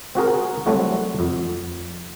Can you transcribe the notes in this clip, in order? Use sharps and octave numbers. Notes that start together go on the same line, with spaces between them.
C4 F#4 G#4 A#4
F#3 G3 A3 C4 E4 F#4
F2